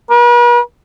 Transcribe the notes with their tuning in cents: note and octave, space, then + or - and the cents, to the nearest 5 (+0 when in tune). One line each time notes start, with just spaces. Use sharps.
B4 -45